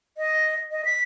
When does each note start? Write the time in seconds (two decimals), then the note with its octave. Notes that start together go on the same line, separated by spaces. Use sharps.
0.18 D#5
0.71 D#5
0.85 B6